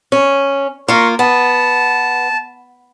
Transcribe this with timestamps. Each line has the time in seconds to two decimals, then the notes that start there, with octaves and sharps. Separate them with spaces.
0.12 C#4
0.88 A#3 F4 A#4 C6 C#6
1.19 B3 A5